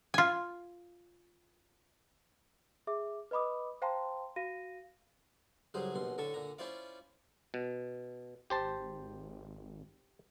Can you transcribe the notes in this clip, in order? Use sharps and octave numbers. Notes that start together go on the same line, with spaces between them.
F4 G#5
G#4 E5 D6
B4 D#5 B5 D6 D#6
C5 F5 G5 A5 A#5 C6
F#4 F5 A#6 D#7
C#2 A2 F#3 G3 G#4 C5
A#1 D#2 B2 C6
A2 D3 A4 A5 C#6
A#2 D3 A#5
C#4 E4 F4 C5 D5 F5
B2
G#1 G4 C5 A5